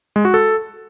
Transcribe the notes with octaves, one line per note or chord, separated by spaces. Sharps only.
G#3
F#4
A4